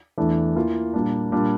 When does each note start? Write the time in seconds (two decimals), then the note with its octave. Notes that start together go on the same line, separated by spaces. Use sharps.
0.18 E2 E3 A3 D4
0.55 E3 A#3 F4
0.94 A#2 G3 A#3 D4
1.32 A#2 G3 D4 F4